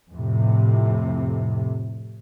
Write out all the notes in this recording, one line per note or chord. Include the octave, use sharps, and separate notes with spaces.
F2 A2 C3